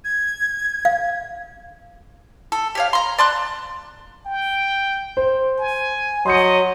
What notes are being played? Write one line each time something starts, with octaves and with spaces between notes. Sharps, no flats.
G#6
F5
A4
G4 C#5 F5
A#5 C6
D5 A5 C6 F#6
G5
C5
G#5
F#3 D#5 C6 G6 C#7